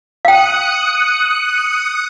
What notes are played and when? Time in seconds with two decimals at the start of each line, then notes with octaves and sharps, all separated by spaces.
0.25 F5 G5 D#6 F#6 C#7